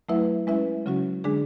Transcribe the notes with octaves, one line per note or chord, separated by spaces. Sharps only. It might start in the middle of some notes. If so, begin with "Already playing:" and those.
F#3 A3 E4 B4 E5
G#3 C#4 E4 B4 E5
C#3 F#3 C#4 F#4
D3 G#3 D4 G#4